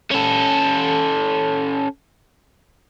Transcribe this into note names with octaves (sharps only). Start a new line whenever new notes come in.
C#4 A4